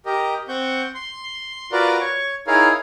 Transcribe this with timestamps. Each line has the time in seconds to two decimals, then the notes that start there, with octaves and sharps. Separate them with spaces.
0.06 G4 A#4 D#5
0.48 C4 F#5 C#6 G6
0.94 C6
1.72 F4 F#4 A#4 B4 D5
2.01 C#5 C#6
2.47 D#4 E4 G#4 A#4 C#5 F5